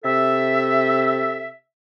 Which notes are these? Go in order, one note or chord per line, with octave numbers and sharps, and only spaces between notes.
C3 A4 E5